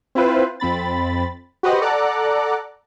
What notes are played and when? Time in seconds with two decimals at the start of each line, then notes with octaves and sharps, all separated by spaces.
0.15 C4 E4 F4 B4 C5
0.60 F2 C4 B5 A6
1.63 F#4 G4 B4 C5 D#5 F#5
1.81 A4 D5 F#5 A#5 D6 F#6